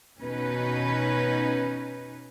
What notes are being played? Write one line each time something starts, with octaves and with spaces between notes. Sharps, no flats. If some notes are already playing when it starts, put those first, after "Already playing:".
B2 C#4 D#4 B4